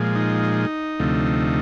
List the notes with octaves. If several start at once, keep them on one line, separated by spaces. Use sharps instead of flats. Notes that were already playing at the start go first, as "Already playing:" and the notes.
Already playing: A#2 F3 G#3
D#4
D2 C3 F3 A3